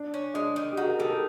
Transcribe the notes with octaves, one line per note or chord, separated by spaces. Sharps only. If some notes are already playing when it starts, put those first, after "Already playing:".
Already playing: D4
C#4
G#3 D4
D#3
G4
D#3 F#4 G#4
G#4 A#4
D#3 G4 A4
G#4 A#4